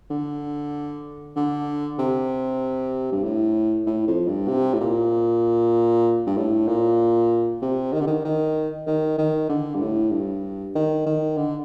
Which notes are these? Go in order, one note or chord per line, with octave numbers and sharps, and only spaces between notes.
D3
D3
C3
G2
A2
A2
F2
G2
C3
A2
A#2
G2
A2
A#2
C3
D#3
D3
D#3
D#3
D#3
D#3
D3
G2
A2
G2
D#3
D#3
D3